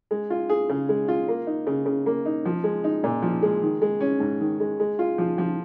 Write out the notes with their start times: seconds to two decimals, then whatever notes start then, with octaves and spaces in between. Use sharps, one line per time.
0.11 G#3
0.30 F4
0.49 G#4
0.69 C#3
0.89 G#3
1.08 F4
1.28 A#3
1.47 D#4
1.67 C#3
1.86 C#3
2.06 A#3
2.26 D#4
2.45 F3
2.64 G#3
2.84 D#4
3.04 A#2
3.22 F3
3.43 G#3
3.63 D#3
3.82 G#3
4.00 C#4
4.20 G#2
4.41 D#3
4.60 G#3
4.80 G#3
4.99 F4
5.18 F3
5.38 F3